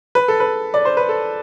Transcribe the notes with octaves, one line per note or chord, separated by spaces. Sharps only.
B4
A4
B4
D5
C5
B4
A4